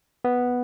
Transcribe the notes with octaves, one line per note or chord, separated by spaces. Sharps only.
B3